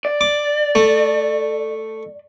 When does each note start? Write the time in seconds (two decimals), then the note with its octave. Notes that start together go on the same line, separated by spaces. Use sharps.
0.05 D5
0.21 D6
0.75 A3